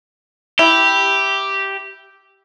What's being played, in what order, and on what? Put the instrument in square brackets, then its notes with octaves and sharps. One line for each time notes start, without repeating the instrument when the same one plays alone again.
[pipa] E4 [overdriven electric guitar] G4